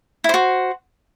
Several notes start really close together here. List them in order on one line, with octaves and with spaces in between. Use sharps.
E4 C5 F#4